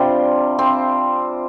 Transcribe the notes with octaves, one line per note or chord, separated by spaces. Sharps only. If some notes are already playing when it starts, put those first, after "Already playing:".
Already playing: C3 G3 D4 F4
C4